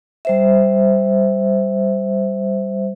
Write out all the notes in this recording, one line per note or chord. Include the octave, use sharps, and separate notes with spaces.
G3 C5 E5